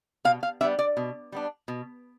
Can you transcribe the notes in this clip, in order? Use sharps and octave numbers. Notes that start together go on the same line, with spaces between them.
B2 F5
F5
G3 B3 D4 E5
D5
B2
G3 B3 D4
B2